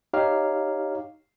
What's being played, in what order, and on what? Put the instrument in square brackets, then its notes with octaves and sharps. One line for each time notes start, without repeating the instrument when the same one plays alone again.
[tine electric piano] D#4 G4 C#5 F5 F6